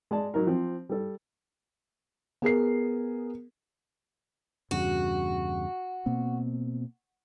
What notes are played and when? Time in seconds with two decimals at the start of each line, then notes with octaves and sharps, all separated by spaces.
0.11 G#3 D5 A5
0.34 F#3 D#4 A#4
0.47 F3 C4
0.89 G3 A4
2.42 B3 G#4 A#4 C7
4.71 E2 G2 C#3 F#4
6.06 B2 A#3 C4